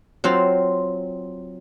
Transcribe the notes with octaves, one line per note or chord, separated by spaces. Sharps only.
F#3 C4 F4 C5